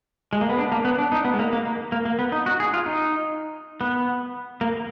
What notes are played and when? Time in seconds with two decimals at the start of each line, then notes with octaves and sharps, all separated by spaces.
0.33 G#3
0.41 A#3
0.49 B3
0.58 D4
0.72 A#3
0.85 B3
0.98 D4
1.12 D#4
1.25 B3
1.34 G#3
1.39 A#3
1.53 A#3
1.65 A#3
1.92 A#3
2.05 A#3
2.19 B3
2.32 D#4
2.46 F#4
2.60 G#4
2.74 F4
2.86 D#4
3.81 B3
4.61 A#3